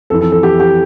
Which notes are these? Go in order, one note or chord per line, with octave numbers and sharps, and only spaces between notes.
F2 E3 A4
A4
A4
G4
G4